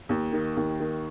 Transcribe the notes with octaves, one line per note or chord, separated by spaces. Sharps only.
D#2
D#3
D#2
D#3